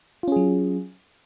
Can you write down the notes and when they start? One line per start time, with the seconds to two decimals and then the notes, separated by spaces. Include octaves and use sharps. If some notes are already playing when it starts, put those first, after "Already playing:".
0.23 F4
0.28 C#4
0.32 G#4
0.36 F#3